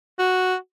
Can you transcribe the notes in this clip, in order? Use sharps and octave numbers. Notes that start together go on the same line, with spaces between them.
F#4